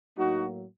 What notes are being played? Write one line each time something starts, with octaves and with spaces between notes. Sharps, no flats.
A2 F#3 A#3 D#4 F#4